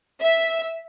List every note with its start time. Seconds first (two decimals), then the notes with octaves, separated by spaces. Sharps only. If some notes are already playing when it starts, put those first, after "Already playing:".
0.22 E5